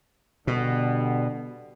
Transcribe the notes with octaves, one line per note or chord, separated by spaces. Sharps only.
B2 D3 G3